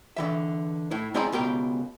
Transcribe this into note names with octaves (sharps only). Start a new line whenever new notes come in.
D3 E3 E5
A2 E4
G#3 C4 E4 D5 D#5 A#5
C#2 B2 G4 A#4